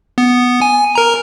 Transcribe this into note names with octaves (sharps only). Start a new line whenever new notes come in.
B3
G#5
A#4 A#5